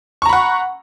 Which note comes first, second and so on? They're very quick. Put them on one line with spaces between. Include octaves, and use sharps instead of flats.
C#6 A#5 B5 F#5